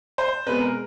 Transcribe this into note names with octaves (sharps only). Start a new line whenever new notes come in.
C5
B2 G#3 C4 B4
A#4